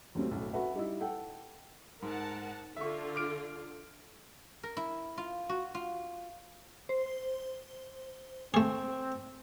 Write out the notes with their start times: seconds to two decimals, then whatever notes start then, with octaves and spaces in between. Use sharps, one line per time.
0.15 D#2 F#3 G3 A3 C4 C#4
0.31 B1 F#2 A2
0.53 F#4 A4 B4 E5 F#5
0.75 G3 D#4 E4
1.00 A4 F#5 G5
2.02 G#2 A#4 F#5 A5
2.76 D3 F4 E5 C#6
3.15 D6 F6 D7
4.63 A#4
4.77 E4
5.18 F4
5.49 F#4
5.75 F4
6.89 C5
8.54 A3 C4 G#4